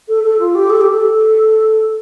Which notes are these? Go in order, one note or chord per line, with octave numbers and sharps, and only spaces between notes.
A4
A4
F4
G4
A4
G4
A4